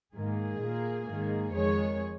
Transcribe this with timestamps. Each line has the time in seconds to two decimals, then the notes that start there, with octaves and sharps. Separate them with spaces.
0.13 G#2 D#3 A#3 G#4
0.59 A#2 A#3
1.06 G#2 D#3 A#3
1.51 F2 D#3 G#3 G#4 C#5